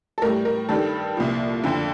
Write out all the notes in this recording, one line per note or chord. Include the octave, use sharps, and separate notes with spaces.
A4
A2 G3 A#4
A#4
G2 D#3 G3 A4
C2 A#2 F3
F2 D3 F3